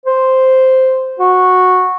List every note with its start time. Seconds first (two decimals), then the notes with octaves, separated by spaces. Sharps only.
0.06 C5
1.20 F#4